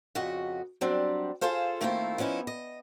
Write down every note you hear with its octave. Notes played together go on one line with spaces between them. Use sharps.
F2 C#3 F#4 D#5
F#3 G3 C4 D4
F4 G#4 A4 C5 F5
D#3 A3 A#3 C4 E4 F4
F3 B3 C#4 D#4 E4
D#5